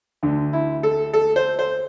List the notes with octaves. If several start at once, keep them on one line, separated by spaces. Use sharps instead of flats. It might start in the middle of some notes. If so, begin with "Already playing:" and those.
D2 D3
E4
A4
A4
C5
C5